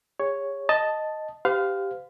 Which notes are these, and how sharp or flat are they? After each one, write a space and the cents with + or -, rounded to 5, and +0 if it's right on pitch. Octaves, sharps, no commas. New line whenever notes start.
G#4 -40 C#5 +0
D#5 +0 A5 +0
G4 +0 C5 -40 F5 +10